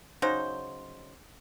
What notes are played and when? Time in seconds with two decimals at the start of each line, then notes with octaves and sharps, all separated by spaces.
0.22 C#3 F#3 D#4 C5